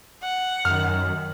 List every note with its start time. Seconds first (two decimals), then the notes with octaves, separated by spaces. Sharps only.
0.22 F#5
0.65 F#2 D#3 F6